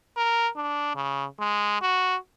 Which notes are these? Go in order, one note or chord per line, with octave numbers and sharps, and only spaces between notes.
A#4
D4
C#3
G#3
F#4